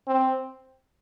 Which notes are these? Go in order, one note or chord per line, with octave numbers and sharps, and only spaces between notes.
C4